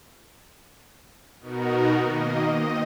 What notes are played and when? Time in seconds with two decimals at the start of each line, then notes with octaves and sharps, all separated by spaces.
1.40 B2 B3 D#4 F#4 A#4
2.00 D#3 A#3 D#5
2.53 C4 D#5